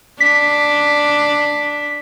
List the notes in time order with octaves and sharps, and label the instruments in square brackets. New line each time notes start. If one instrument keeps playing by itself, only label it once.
[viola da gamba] D4 [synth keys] B6